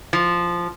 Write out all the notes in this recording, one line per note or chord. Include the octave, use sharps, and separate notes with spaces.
F3